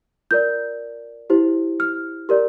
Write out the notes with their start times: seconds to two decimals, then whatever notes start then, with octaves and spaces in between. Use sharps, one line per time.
0.31 F4 A#4 D5 G6
1.30 E4 G4 C5
1.80 F6
2.29 G4 A#4 D5